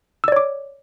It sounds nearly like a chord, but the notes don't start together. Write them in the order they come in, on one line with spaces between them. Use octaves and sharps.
E6 D5 C#5 D6